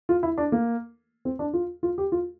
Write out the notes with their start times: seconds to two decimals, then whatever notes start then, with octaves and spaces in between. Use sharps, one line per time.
0.09 F4
0.23 E4
0.38 D4
0.52 A#3
1.25 C4
1.39 D4
1.53 F4
1.83 F4
1.98 G4
2.12 F4